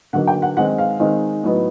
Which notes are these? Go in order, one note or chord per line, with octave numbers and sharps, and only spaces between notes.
D3 F#3 A#3 D#4 F#5
G5
F#5
D#3 G#3 C4 D#4 F#5
F5
D#3 G#3 C4 D#4
A2 F#3 B3 D#4